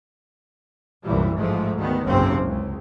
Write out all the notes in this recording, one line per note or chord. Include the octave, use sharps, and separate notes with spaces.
C2 F#2 A#2 E3 G3
A1 G#2 F3 G#3 A3
D2 D#3 B3
F#1 B1 G#2 C3 C4 C#4
C#2